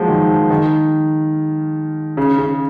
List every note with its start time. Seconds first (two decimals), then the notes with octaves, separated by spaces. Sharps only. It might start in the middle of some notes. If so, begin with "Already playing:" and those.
Already playing: F3 F#3 G#3 A#3 D#4
0.08 D#3
0.30 F3
0.50 D#3
2.17 C#3
2.38 C#3